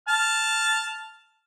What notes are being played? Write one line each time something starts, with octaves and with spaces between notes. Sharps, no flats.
A5 F6